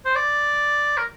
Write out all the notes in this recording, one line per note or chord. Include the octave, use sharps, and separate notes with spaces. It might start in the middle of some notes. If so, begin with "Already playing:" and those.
C5
D5
A#4